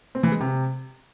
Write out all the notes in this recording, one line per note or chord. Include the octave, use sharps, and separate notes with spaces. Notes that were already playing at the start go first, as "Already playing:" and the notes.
C4
E3
G#3
C3